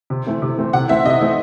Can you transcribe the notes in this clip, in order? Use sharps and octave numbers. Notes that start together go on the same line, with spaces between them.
C3
E3 A3 C4
C3
E3 A3 C4
C3 F#5
E3 A3 C4 E5
C3 D#5
E3 A3 C4